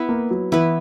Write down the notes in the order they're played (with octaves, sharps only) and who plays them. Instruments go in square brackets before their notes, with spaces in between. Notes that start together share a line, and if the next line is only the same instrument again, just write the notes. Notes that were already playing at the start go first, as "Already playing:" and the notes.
Already playing: [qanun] B3 E4 B4
[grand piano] A#3
F#3
[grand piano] E3 [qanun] B3 E4 B4